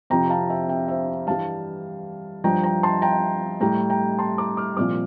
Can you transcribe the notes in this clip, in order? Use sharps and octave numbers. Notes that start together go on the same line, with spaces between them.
F2 C3 F3 G5 A#5
F5 A5
E5 G5
E5 G5
C5 E5
G2 E3 G3 F5 A5
G2 F3 G5 A#5
G5 A#5
A5 C6
G5 A#5
A2 G3 G5 A#5
G5 A#5
A5 C6
A#5 D6
D6 F6
C2 A#2 F3 D6 F6